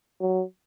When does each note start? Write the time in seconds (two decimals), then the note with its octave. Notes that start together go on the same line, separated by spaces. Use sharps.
0.20 F#3